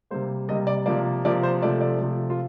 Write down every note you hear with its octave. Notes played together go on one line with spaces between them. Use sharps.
C3 G3 A#3 C5
C3 G3 A#3 D#5
D5
C3 F3 A#3 D5
C3 F3 A#3 D5
C5
C3 F3 A3 D5
D5
C3 F3 A3
F4